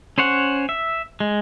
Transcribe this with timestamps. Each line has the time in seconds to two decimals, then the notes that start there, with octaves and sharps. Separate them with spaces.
0.18 C#4 C5 C#5 F#5
0.69 E5
1.20 G#3